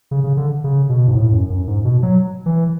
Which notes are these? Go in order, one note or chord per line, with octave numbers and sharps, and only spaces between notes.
C#3
C#3
D3
C#3
B2
G#2
A2
F#2
F#2
G#2
B2
F#3
E3